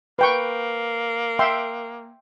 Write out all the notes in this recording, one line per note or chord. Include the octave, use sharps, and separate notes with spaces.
A#3 B4 G5 C#6
E5 G5 C6